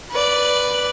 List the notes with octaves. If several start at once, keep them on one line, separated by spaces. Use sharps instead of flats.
B4 D5